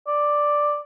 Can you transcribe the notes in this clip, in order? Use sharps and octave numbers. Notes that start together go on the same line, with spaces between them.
D5